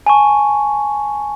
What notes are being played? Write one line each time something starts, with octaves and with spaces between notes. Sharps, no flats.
G#5 A5 C#6